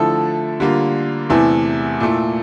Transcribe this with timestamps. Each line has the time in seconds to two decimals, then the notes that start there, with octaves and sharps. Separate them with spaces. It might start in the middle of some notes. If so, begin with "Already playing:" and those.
Already playing: D3 F3 A3 E4 A4
0.60 D3 G3 A#3 F4
1.30 E2 C3 E3 A3 E4
2.00 A#2 A3 E4